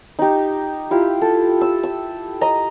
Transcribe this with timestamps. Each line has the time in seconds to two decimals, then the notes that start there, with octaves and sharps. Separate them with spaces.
0.19 D#4 G4
0.91 E4 F4 G4
1.22 A4
1.61 E6
1.83 E6
2.41 D#5 A#5